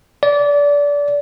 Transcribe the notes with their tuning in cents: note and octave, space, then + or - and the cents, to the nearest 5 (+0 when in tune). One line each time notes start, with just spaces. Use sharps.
D5 -25